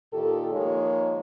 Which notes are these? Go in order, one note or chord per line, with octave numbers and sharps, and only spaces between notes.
A#2 D#3 F4 G4 A4
D#3 F3 G#3 A#3 D#4 C#5